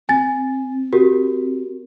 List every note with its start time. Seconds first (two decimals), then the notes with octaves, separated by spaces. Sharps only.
0.09 C4 G#5 A6
0.93 F#4 G4 A#4